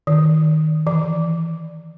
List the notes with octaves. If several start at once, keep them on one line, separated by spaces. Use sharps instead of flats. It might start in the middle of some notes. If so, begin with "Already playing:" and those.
D#3
E3